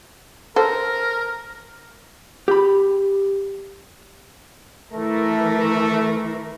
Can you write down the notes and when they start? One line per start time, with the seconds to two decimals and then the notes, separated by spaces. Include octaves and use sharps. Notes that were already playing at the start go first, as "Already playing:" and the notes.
0.56 A4 A#4 C5
2.48 G4 B5
4.92 E3 A3 A#4